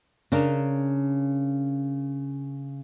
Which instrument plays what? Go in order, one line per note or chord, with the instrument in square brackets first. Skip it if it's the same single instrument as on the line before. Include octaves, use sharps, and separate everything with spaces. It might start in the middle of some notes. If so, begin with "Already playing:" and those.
[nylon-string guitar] C#3 C#4 D4 A#4